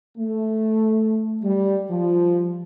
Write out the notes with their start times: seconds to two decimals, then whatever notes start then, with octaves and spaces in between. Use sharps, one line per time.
0.17 A3
1.42 G3
1.89 F3